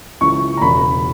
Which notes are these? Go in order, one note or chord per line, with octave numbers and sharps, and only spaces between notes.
C#2 C#3 E3 C#6
A#5
E1 E2 C#3 B5